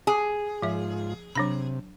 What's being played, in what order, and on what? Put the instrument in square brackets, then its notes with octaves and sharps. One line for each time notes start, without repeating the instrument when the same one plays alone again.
[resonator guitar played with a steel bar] G#4
[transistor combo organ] G#2 F4 [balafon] F3 E5
[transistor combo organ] C3 [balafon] F#3 D4 B5